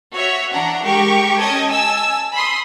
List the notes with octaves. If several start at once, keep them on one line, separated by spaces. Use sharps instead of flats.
F#4 C#5 E5
E3 D4 F#5 A#5
G#3 G4 A#4 C#6
C#4 D#5 G5 A5 G#6
G#5 A5 E6
B5 C6 D#6